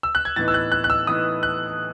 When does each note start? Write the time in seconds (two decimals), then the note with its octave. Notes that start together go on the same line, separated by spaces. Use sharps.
0.03 E6
0.15 F#6
0.25 G#6
0.36 A2 E3 B3 D#4 A6
0.48 E6
0.54 F#6
0.72 F#6
0.84 F#6
0.90 E6
1.07 A2 E3 B3 D#4 D#6
1.43 F#6